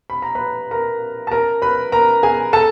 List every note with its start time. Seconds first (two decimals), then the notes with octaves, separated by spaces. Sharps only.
0.10 B5
0.22 A#5
0.35 B4 B5
0.71 A#4 A#5
1.27 A5
1.31 A#4 A#5
1.62 B4 B5
1.92 A#4 A#5
2.23 G#4 G#5
2.53 A4 A5